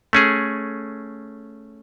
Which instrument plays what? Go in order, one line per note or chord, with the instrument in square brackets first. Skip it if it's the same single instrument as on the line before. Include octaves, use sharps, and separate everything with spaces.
[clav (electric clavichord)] A3 C#4 G#4